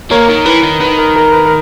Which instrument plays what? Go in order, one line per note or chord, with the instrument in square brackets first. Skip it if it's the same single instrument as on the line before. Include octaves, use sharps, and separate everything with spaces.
[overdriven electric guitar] A#3 [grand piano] A#4 C#5
[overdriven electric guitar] D#3 [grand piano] A#4
[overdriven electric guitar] E3 [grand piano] B4
[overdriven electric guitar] D#3
[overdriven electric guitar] D#3 [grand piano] B4
[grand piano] A#4
A#4
B4
A#4